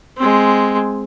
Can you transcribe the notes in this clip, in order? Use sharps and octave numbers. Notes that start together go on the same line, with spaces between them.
G#3 C4